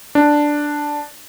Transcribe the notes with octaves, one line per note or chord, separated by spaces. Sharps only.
D4